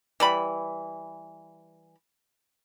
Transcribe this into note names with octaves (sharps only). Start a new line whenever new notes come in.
E3 G3 B5